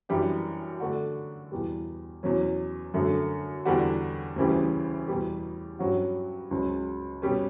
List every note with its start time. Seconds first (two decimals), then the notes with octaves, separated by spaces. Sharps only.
0.09 F#2 E3 G3 D4
0.80 D3 A3 D4 F#4
1.52 E2 B2 G3
2.23 E2 B2 F#3 C#4
2.94 F#2 D3 A3
3.65 E2 D3 G3 D4 F#4
4.36 D2 C#3 E3 G3
5.08 E2 B2 G3
5.79 G2 F#3 C#4 F#4
6.51 C#2 C#3 F#3
7.22 B2 G3 C#4